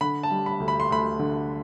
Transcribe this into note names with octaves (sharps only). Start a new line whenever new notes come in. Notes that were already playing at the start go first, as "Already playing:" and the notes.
D3 B5
A5
G3
B5
D2
B5
C6
D2 B5
D3